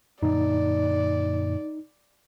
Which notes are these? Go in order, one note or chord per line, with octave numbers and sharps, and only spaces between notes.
F#2 A#2 D3 D#4 D5